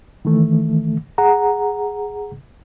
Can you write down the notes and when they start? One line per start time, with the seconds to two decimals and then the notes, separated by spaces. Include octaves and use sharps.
0.25 D#3 E3 A3
1.18 G#4 F#5 A#5